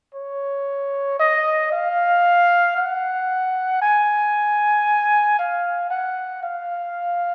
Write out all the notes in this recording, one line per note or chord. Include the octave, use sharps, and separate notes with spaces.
C#5
D#5
F5
F#5
G#5
F5
F#5
F5